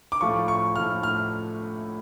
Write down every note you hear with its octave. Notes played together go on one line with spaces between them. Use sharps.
D6
A2 F3 A3 F4 C#6
C#6
A2 F3 A3 F4 F6
F6